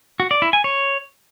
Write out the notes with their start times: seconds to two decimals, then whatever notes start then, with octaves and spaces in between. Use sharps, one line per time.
0.20 F#4
0.31 D5
0.42 E4
0.53 G#5
0.64 C#5